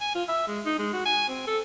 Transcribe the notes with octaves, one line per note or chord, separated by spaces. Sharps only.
G#5
F4
E5
G#3
D#4
G#3
F#4
G#5
C4
A4